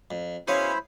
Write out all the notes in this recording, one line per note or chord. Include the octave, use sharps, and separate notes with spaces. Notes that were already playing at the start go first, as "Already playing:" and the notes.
F2
B2 C#4 E4 G#4 C5 C#5 F5 B5